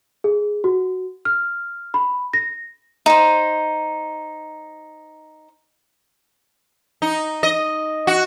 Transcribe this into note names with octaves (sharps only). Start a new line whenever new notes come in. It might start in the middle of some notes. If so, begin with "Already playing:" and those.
G#4
F#4
F6
B5
A#6
D#4 C5
D#4
D#5
F#4